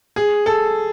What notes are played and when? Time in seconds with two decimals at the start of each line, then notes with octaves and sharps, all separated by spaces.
0.16 G#4
0.46 A4